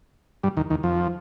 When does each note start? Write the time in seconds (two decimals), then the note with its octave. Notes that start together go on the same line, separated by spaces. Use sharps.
0.43 G2 G3
0.57 D#2 D#3
0.70 D#2 D#3
0.83 F2 F3